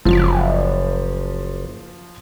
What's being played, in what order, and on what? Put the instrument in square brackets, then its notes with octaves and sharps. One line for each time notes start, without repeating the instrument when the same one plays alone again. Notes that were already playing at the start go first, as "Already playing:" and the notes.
[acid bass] F#1 [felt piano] F3